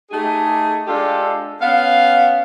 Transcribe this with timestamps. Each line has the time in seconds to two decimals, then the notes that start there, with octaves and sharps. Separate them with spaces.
0.11 A3 D#4 G4 G#4
0.87 G#3 D4 F4 G4 A4
1.62 B3 C#4 F5